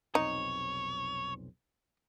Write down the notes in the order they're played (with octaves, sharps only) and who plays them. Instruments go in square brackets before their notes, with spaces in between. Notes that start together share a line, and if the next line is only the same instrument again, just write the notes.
[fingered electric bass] F1 B1 C4 [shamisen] D#4 [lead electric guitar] C#5